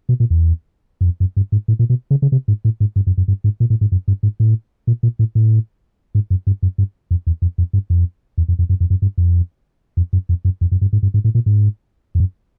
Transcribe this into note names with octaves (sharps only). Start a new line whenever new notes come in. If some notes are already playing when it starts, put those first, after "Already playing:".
B2
A#2
E2
F#2
F2
F#2
G2
G#2
A2
A#2
B2
C#3
C#3
C3
G#2
A2
G#2
G2
F#2
F#2
G2
G#2
A#2
A2
G#2
F#2
G2
G#2
A2
A#2
A#2
A2
A2
G#2
F#2
G2
F#2
G2
F2
E2
F2
F2
G2
F2
E2
F2
F2
F#2
F2
F#2
G2
F2
F2
F#2
F2
F#2
F2
F#2
G2
G#2
G2
G#2
A2
A#2
G#2
F2
F#2